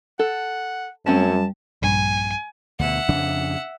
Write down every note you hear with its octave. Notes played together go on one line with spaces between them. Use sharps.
A4 F#5
F#2 G3 A3 C4 C#4 A5
A#1 G2 G#5
D2 B2 E5 F#5
F2 C#3 D4